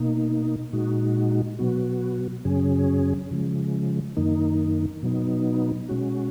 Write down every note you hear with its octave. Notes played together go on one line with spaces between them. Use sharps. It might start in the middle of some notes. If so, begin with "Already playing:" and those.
Already playing: B2 A#3 D#4
A#2 G#3 D#4 F#4
B2 F#3 B3 F#4
F#2 C#3 F#3 C#4 G#4
C#3 F3 G#3
F#2 D#3 A#3 D#4
B2 F#3 B3 D#4
B2 G#3 C#4 F#4